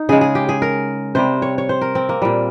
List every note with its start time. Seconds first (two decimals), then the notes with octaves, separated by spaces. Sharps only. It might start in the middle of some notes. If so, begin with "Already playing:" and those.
Already playing: D#4
0.09 C#3 G#3 G#4
0.21 G#4
0.35 G4
0.49 G#4
0.62 A#4
1.15 C3 G3 C5
1.42 C#5
1.58 C#5
1.69 C5
1.81 A#4
1.95 C4
2.09 A#3
2.22 A#2 G3